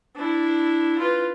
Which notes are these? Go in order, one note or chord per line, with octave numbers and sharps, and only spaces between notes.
D4 E4
F4 B4